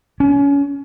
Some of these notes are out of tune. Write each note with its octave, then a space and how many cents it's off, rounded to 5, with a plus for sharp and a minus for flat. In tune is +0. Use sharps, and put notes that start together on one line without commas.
C#4 +25